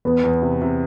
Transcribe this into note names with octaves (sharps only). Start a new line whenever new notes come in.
E2 B3
E2
C3
C3